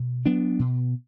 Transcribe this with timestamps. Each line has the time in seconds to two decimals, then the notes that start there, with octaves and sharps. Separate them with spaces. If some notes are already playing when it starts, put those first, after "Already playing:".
Already playing: B2
0.26 F#3 B3 D4
0.59 B2